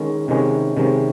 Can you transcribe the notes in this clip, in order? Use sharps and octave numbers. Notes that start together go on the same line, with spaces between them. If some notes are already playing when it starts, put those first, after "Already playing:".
Already playing: D#3 G#3 C#4
C3 D#3 G#3 C#4
C3 D#3 G#3 C#4